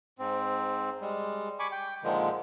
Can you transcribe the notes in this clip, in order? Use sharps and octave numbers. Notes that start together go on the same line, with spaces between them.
G#2 C4
G3 G#3
G#5 B5 C#6 D6
G5
A#2 D3 D#3 F3 G#3